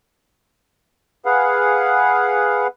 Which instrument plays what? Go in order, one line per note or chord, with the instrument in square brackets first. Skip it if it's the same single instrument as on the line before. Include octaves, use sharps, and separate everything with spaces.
[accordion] G#4 B4 F5 F#5